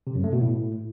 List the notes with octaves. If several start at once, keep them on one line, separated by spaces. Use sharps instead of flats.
C3
F#2
A3
B2
A2